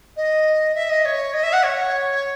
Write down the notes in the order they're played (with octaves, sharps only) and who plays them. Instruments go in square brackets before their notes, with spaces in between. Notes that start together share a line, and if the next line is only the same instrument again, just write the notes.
[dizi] D#5
E5
D#5
C#5
D#5
E5
F#5
C#5